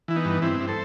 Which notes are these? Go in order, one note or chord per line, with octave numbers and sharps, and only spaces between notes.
E3 E4
B3 D#4
G2
G2 C4 E4
G2
A4 C5